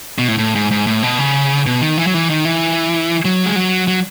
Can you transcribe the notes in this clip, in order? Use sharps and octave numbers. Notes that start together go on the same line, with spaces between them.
B2
A2
A2
G#2
G#2
A2
B2
C#3
B2
D#3
E3
F#3
E3
D#3
E3
F#3
G#3
F#3
F#3